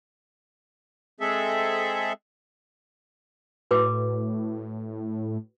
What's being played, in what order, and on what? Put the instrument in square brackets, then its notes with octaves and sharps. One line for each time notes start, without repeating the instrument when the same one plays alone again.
[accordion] G#3 C4 G#4 A4 E5
[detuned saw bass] A2 [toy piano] F#4 B4 D6